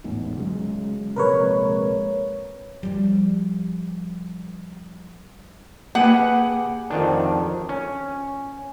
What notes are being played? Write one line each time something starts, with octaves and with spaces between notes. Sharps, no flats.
A1 E2 G#2
C#3 F#3 G#3
A#1 C3 G#3 A#4 B4 C#5
F3 G3
A#3 G4 G#4 B4 F#5
F2 D#3 D4
C#4